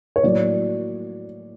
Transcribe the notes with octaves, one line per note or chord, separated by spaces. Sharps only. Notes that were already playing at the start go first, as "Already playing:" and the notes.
C#5
A2 F#3 A#3 D5